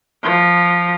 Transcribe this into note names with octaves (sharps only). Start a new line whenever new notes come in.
F3